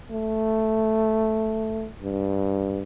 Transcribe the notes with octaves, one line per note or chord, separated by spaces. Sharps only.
A3
G2